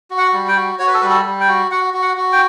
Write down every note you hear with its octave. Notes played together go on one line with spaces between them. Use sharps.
F#4
F#5
G3
G5
F#4
F#4 C#5
B4
A4
G3 B4
A4
G3
G5
F#4
F#4 F#5
F#4
F#5
F#4
G5